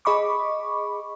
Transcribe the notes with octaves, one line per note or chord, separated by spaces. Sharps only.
G#4 D#5 B5 C#6 D6